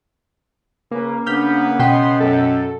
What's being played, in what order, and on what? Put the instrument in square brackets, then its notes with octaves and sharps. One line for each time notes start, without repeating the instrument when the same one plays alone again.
[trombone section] C#3 C#4 B4 [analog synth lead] A#3
[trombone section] C#3 B3 [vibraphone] D4 [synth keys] F6 G6 B6
[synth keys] B2 G5 B6 [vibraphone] C#4 D#5 [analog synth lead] C6
[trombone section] F#2 [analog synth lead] A4